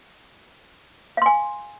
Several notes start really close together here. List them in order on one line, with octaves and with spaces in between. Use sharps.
F5 C6 G#5